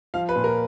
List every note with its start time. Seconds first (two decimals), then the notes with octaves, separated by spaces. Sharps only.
0.14 F3 F5
0.29 B4
0.36 A#2
0.44 A#4